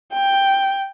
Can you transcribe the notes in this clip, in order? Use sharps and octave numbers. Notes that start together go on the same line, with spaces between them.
G5